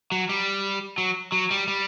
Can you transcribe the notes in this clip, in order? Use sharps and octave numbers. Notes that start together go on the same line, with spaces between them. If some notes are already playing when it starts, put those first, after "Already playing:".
F#3
G3
F#3
F#3
G3
G3